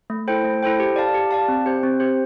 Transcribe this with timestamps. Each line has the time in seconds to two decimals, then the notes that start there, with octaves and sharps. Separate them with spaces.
0.10 A3
0.28 E4 A4 C5 G5
0.44 A3
0.63 E4 A4 C5 G5
0.80 G4
0.96 D5 F5 A5
1.14 G4
1.31 D5 F5 A5
1.48 C4
1.66 G4 C5
1.83 C4
2.00 G4 C5